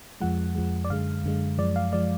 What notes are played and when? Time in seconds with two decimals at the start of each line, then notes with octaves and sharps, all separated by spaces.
0.20 F2 F3 G#3 F#5
0.55 F2 F3 G#3
0.84 D5
0.90 F#2 D3 G#3 F5
1.24 F#2 D3 G#3
1.58 F#2 F3 G#3 D5
1.76 F5
1.93 F3 G#3 D5